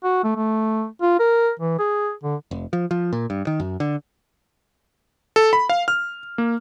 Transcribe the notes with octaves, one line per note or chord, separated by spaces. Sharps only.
F#4
A3
A3
F4
A#4
E3
G#4
D3
F1
F3
F3
A#2
G2
D#3
F#2
D3
A4
B5
F5
F6
A#3